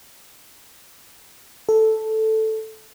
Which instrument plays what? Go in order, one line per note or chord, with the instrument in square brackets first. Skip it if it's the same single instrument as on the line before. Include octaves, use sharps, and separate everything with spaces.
[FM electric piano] A4